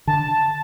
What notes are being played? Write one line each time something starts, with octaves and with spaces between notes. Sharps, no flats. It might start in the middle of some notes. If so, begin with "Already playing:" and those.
D3 A5